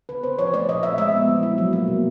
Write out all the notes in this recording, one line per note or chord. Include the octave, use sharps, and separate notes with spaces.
C#3 B4
C4 C5
F3 C#5
A3 D5
A#2 D#5
C4 E5
G#3 E5
B3
F3
E4
F#3
A#3
B2